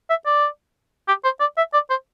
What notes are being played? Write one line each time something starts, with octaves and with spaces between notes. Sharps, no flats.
E5
D5
G4
C5
D5
E5
D5
C5